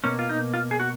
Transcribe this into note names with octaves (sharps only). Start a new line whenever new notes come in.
B2 A#3 C#4
F4
D#4
F4
G#4
F#4